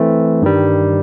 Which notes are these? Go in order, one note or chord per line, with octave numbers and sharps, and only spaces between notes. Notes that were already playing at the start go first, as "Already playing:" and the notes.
Already playing: E3 A3 C4
G2 D#3 G3